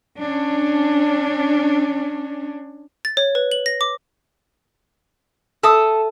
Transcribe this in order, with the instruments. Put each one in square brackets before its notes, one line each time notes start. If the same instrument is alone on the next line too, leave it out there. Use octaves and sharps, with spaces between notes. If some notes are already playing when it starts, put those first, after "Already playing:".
[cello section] C#4 D4
[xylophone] A6
C#5
B4
F#7
A#6
D6
[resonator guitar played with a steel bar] A4 [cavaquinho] E5 A5 D#6